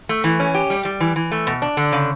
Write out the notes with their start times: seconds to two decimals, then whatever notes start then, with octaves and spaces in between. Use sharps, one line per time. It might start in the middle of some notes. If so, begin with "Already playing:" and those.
0.09 A3
0.24 E3
0.40 C#4
0.54 G4
0.70 G3
0.85 G3
1.00 E3
1.16 E3
1.32 A3
1.47 B2
1.62 D4
1.77 D3
1.92 C#3